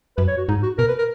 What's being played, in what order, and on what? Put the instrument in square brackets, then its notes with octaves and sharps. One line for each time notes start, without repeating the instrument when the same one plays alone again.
[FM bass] F#2 [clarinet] B4
[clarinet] C#5
F#4
[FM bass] G#2 [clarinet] D#4
[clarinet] F#4
[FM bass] B2 [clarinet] A#4
[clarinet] B4
A#4